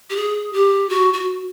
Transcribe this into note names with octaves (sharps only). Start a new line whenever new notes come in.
G4
G#4
G4
F#4
F#4